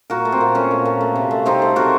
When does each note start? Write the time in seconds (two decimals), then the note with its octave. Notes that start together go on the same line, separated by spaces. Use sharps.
0.10 A#2 F#4 A#4
0.25 A3
0.32 C4
0.41 A#2
0.55 A3 C#4
0.71 A#2
0.85 A#2
1.01 A3
1.16 C3
1.31 A3
1.46 C3 C4 D#4
1.62 A3
1.76 C3 F#4 A#4